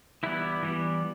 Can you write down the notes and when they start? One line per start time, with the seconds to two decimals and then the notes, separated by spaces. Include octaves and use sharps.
0.23 E3 G3 B3 E4
0.63 E3 G3 B3